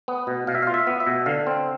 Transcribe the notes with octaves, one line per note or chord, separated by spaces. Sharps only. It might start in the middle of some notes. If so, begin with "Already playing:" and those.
B3
B2
B2 F5
E5
F4 F5
E5
B3
E5
B2
D3 F5
C4